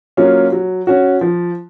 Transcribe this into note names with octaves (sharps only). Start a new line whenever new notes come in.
F#3 A#3 C#4 F4
F#3
C#4 F#4
F3